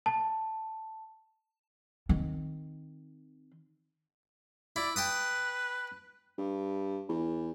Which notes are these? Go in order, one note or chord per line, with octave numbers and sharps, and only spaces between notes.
A5
D#3 C4
E4 D5
B4 G5 A5 D#6
G2
E2